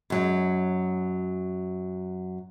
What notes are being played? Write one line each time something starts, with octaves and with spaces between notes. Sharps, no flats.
F#2 F#3 G#3